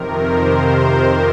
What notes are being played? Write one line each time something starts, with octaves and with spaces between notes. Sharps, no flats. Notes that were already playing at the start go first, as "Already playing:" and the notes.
Already playing: F2 C3 D#3 A#4
C5